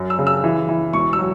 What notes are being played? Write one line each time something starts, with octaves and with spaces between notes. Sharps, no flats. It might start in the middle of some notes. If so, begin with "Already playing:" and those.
Already playing: F#2
E6
C#3
E6
E3
E3
E1 C#6
E6
F#3